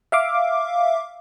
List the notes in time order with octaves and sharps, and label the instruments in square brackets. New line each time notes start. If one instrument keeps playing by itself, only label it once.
[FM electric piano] E5 F5 D6